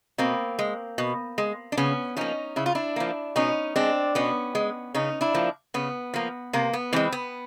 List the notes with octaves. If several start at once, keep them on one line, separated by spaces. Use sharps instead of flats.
B2 A#3 C4
G#3
B2
G#3
D4
C#3 B3 C#4
F3 A#3 C#4 D#4
C#3 E4
F4
D4 E4
F3 A#3
B2 C#4 D#4
G#3 C4 D4
B2 B3 C#4
G#3
C#3 C#4 D#4
D4 E4
F3 A#3
C#3 B3
F3 A#3
C3 A#3
B3
E3 G#3 A#3 C4
B3